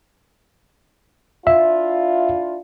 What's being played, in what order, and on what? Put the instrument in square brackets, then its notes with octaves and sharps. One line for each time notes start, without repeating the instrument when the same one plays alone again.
[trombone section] D4 E4 F4 [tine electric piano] E5